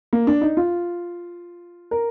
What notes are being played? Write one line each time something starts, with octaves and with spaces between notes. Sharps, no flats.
A#3
D4
D#4
F4
A#4